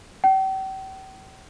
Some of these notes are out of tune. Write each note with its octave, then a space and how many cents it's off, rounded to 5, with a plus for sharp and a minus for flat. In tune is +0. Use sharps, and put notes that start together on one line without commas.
G5 -40